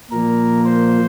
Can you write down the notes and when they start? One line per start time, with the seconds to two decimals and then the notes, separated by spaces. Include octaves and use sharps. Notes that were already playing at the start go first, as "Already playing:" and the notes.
0.11 A#2 F3 A#3 A#4
0.65 C5